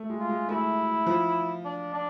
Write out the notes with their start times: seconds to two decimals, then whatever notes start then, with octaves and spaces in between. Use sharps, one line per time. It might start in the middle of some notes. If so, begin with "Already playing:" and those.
Already playing: A3
0.10 G#3
0.20 F4
0.29 G#3
0.49 A3 E4
1.07 F3
1.65 D4
1.94 D4